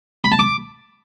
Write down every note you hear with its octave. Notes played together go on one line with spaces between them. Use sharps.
B5
A5
D6